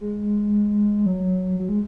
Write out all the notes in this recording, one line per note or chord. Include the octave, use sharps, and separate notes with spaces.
G#3
F#3
F#3
G#3